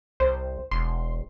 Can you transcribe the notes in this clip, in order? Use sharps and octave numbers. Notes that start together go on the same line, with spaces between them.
C2 C5
E1 C6